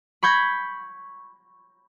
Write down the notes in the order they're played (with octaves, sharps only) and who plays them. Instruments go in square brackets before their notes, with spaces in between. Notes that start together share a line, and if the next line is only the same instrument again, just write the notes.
[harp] B5 C#6 G6 G#6 A#6